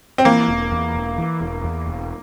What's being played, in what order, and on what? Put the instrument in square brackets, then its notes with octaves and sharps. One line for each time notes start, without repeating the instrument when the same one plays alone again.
[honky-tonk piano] C4
[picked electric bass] E3 [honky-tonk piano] A#3
[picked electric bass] E1
E2
E1
E3
E1
E2
E1